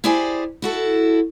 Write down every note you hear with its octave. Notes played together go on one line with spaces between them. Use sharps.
E4 G4 G#4 C5 D5 G#5
E4 F#4 A4